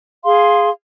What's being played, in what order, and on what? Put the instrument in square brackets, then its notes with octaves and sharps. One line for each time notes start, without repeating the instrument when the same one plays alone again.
[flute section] G#4 F5 C6